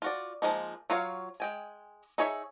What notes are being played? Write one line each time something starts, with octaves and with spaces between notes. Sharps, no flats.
F4 F#4 D5
F3 G#3 A#3 D#4
F#3 F4 C#5 F5
G#3 G5 G#5
D#4 G#4 C#5 D#5 E5